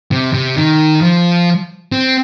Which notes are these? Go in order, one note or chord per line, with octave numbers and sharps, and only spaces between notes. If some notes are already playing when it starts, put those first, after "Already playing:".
C3
C3
D#3
F3
C4